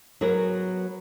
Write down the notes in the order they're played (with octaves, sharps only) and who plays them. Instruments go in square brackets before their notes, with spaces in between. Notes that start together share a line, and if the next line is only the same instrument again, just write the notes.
[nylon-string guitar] F#3 B3 G#4 A#4 C#5